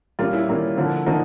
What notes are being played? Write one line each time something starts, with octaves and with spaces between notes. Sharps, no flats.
A#2 G3 A#3 C#4 F4
E4
A#2 G3 A#3 C#4
D3 F3 A#3
D3 F3 A#3 D#4